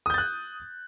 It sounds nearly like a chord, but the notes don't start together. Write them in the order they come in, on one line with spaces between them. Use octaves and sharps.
D#6 G6 A6 F#6